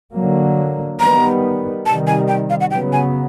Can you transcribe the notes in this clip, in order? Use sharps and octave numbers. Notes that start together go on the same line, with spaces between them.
D3 F#3 A#3
D#3 G3 B3 A#5
C3 D#3 G3 A5
G#5
G5
F5
F#5
C#3 F#3 B3 G5
G#5